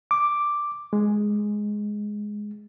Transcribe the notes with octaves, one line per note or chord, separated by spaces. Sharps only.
D6
G#3